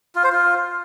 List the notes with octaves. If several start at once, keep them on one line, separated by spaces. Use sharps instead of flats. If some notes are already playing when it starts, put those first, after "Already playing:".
F4
C5
F4